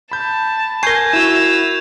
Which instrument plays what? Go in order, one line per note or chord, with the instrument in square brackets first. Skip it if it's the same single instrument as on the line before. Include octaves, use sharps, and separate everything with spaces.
[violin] A5 [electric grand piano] B5 G6
[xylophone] A#4 C7 [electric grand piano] G#5 A#6 [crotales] C#6 G6 G#6
[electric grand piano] E4 F#4 [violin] E6 [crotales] E7 F7